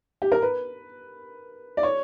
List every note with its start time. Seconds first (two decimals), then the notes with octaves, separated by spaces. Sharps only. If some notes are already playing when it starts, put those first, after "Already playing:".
0.22 G4
0.32 A#4
0.42 B4
1.77 D5
1.83 C#5